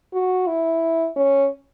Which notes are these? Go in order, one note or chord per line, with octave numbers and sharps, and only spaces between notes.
F#4
E4
C#4